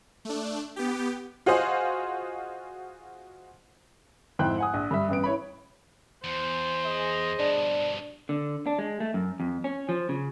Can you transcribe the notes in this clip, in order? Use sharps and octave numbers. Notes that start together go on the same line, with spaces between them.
A3 D4
B3 G4
F4 F#4 G#4 C5 D#5 F5
F2 G#2 E4 C5 G5 F#6
F#5 G#5 D#6
A#1
G2 E5
A1 G2 B3 D7
E4 C#5 B5
E2 C5
G#4 D#5
G2 B2 D4
D3
D4
G#3
A3
F#2
F2
C#4
F3
C#3